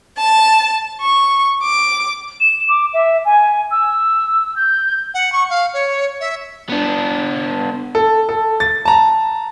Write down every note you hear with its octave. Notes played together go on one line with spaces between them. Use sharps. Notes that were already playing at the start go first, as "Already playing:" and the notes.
A5
C#6
D6
E7
D6
E5
G#5
E6
G6
F#5
C#6
F5
C#5
E5
B3 D4
A4
A4
A6
A5 A#5